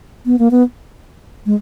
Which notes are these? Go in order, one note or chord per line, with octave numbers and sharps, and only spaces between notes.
B3
A#3
B3
G#3